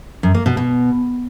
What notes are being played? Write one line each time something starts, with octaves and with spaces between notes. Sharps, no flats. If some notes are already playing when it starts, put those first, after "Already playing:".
F#2
A#3
B2
B2